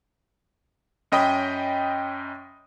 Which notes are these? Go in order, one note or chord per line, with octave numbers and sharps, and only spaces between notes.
F#2 C#4 D#5 G5 B5 D#6